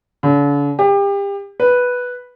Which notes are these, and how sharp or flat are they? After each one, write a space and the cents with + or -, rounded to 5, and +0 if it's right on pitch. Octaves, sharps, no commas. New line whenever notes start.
D3 -45
G4 +30
B4 -5